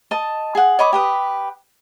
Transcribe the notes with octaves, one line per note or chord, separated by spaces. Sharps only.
D#5 A5
G#4 F#5
C#5 D#5 B5 D6
G4 B4 D#6